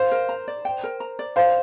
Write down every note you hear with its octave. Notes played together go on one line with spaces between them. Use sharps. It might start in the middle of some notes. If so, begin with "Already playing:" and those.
Already playing: C5 F5
A#4
A#5
D5
G5
A#4
A#5
D5
C5 F5